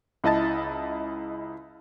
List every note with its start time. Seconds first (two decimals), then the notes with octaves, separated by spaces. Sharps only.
0.24 C#2 E4 D#5 A5 A6